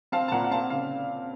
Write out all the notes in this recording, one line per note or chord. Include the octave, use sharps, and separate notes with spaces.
C4 F5 A5
A5
A#2 F#5 A#5
F#5
C4 F5 A5
F#5
C#3 F5